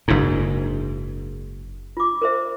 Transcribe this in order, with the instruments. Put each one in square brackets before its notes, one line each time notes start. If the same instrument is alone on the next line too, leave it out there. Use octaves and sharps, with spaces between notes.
[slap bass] F#1 G#2 [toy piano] D4 E4
[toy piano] F4 D6
A#4 C5 E5